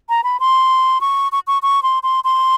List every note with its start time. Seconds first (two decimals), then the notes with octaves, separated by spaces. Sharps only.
0.09 A#5
0.24 B5
0.40 C6
1.01 C#6
1.32 C#6
1.47 C#6
1.62 C#6
1.83 C6
2.03 C6
2.24 C6